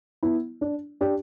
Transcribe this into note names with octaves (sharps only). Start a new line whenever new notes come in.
B3 E4
D4
D4 G4